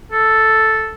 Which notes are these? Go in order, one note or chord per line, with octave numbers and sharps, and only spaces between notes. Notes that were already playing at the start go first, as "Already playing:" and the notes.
A4